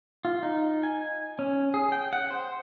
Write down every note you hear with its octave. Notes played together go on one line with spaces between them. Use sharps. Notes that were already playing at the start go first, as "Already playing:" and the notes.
F4
D#4
G#5
C#4
G#4
G5
F#5
C5